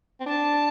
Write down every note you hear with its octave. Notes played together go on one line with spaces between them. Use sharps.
C4
D4 A5